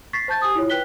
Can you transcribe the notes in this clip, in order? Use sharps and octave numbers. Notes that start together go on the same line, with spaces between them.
C#6 A6 B6 C7
C5 A5 G6 A6
G4 G#5 D#6
E4 F4 C#5
B4 G5 F#6 B6 G7